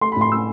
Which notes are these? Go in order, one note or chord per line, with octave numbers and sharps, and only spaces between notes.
A3 C6
B5
A2 C6
A2 E6